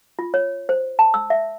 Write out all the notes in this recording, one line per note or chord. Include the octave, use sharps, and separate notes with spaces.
F4
C#5
C5
A5
E6
E5